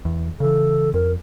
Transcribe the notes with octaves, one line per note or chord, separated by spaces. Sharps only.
E2
C#3 E3 A4
F2 A#4